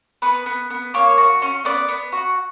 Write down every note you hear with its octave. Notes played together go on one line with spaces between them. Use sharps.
B3 B4
B3
B3
A#3 C#5
F#4
C#4
B3 D5
B3
F#4